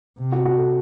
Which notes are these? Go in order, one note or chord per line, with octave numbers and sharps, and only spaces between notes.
C3
F#4
F#4
A4